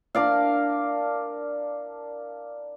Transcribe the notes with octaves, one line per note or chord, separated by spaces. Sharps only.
D4 A#4 D5 F5